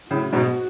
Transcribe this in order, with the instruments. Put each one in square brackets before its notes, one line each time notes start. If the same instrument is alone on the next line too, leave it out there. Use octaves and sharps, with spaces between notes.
[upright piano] A2 C#3 [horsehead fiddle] F#4
[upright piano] G#2 B2